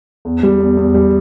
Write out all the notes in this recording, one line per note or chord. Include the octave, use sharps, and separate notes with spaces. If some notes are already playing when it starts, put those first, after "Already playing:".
E2
G3
E2
E2
G3